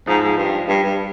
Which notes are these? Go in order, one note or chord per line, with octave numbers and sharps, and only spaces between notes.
G#2 F3
G#2
G2
G2 G3
G2